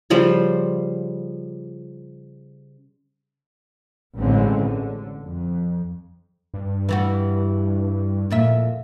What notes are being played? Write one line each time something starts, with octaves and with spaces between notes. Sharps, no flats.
C#3 F3 G3 C5
A1 D3 G#3 C4 C#4
D3
F2
G2
E3 G3 F#4
F2 A#2 E5